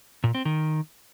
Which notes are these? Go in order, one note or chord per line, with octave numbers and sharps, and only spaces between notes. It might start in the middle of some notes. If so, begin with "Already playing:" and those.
A#2
C4
D#3